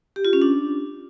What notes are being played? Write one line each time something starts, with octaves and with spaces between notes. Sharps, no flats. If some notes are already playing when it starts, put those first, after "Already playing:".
G4
F4
C#4
D4